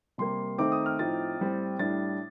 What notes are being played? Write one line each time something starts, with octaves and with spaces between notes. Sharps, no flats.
C3 G3 A#3 C6
D#3 A3 C4 D#4 D6
D#6
F6
A2 F3 C4 D#4 A6
A2 G3 C4
A2 G3 D4 A6